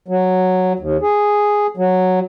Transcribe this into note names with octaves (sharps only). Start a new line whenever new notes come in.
F#3
D#2
G#4
F#3